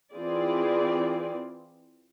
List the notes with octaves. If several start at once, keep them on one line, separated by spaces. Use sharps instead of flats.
E3 C4 F4 G#4 D5